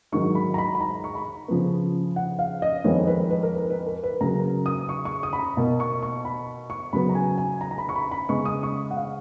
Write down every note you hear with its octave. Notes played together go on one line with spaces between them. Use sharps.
G#2 D#3 F#3 C#6
B5
A#5
B5
B5
A#5
C#6
B5
C#3 F3 B3
F#5
F5
D#5
F2 D#3 G#3 B3 C#5
B4
B4
A#4
B4
B4
A#4
B4
C#3 F#3 A#3 A#5
D#6
C#6
C#6
D#6
B5
A#5
B2 A#3
C#6
C#6
B5
C#6
C#3 F#3 B3 B5
A#5
G#5
G#5
A#5
A#5
B5
C#6
B5
B5
C#3 G#3 B3 C#6
D#6
C#6
F#5
F5